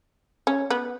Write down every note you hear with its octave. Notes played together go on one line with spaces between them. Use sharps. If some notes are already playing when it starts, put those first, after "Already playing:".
C#4
B3